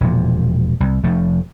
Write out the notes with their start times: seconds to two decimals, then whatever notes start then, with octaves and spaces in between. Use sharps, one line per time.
0.01 E1 A#2 F3
0.80 C2
1.04 F1 F3 A3